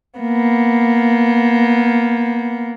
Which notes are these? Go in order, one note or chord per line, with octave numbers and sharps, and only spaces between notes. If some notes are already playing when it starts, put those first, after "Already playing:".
A#3 B3